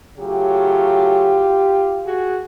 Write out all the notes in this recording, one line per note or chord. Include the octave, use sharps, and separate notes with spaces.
C#3 F#3 A3 F4 G4
F#4 G#4